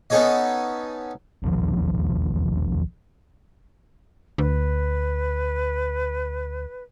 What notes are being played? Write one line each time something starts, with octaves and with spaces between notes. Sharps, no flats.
B3 C#4 D#4 A4 C#5 D#5
E1 A#1 D#2 F3
D2 B4